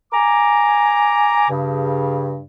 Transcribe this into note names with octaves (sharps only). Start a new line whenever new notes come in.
G#5 A#5 D6
G2 C#3